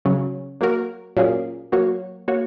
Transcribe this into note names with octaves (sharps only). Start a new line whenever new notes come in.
C#3 F#3 C#4
F#3 A#3 F#4 A#4
A#2 F#3 A#3 C#4 G#4
F#3 A#3 F#4 C#5
A#3 F#4 C#5